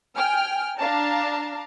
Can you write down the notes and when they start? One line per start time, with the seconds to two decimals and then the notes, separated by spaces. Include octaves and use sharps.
0.16 G5 G#5 F6
0.77 D4 F5 A5 A#5